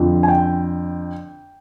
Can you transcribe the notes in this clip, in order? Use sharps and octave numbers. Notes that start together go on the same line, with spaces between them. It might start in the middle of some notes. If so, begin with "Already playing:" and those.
Already playing: F2 D3 F3
G#5
G5